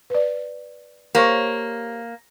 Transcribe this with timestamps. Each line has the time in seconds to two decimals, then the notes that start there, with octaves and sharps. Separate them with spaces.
0.10 B4 D5
1.15 A#3 G4 C5 C#5